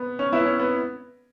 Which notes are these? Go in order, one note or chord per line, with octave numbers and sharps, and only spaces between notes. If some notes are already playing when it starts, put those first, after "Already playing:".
Already playing: B3
C#4
B3 E4
C#4
B3